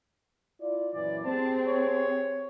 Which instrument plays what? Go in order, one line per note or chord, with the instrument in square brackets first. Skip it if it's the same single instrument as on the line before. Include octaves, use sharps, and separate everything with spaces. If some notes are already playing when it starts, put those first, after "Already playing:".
[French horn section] E4 F4 D5
[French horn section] F#2 A#2 E3 [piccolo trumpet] D5
[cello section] C4 [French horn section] G4 G#4 C5 [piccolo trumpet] A5
[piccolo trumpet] C#5